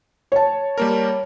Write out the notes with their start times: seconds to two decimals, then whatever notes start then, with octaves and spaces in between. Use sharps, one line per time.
0.32 C#5 A5
0.78 G3 A#3 A#4